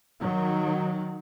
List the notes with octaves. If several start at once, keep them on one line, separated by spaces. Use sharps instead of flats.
D#3 F#3